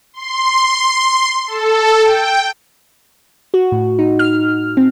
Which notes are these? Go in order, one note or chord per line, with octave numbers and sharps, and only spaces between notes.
C6
A4
G5
F#4
A2
D#4
F6
C4